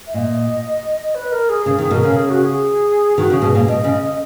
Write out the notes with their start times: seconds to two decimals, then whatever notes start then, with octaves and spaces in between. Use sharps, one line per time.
0.07 E5
0.14 A#2 D#5
1.15 B4
1.32 A#4
1.49 G#4
1.66 C#3 G#4
1.78 D#3
1.82 G#4
1.91 B2 A#4
2.03 C#3
2.16 G#4
2.30 F#4
2.43 G#4
3.17 D#3 F#4
3.30 C#3
3.34 G#4
3.42 B2
3.55 A#2
3.68 B2 D#5
3.84 C#3